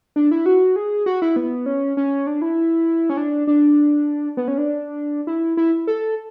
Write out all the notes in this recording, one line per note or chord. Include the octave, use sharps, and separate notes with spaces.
D4
E4
F#4
G#4
F#4
E4
B3
C#4
C#4
D4
E4
C#4
D4
D4
B3
C#4
D4
E4
E4
A4